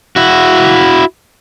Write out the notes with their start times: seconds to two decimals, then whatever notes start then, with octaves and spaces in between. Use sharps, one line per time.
0.16 E4 F#4